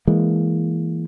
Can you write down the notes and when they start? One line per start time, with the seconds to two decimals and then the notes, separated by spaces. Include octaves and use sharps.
0.07 E3 G#3 A#3